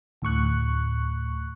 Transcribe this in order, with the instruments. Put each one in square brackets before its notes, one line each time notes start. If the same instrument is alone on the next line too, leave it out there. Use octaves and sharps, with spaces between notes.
[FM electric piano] D2 A2 C#6 F#6